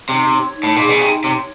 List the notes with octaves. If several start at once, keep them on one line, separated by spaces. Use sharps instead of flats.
C3 D#4
C#5
D#4
A2
A#2 G#4
B2
C3 D#4
C3 C#5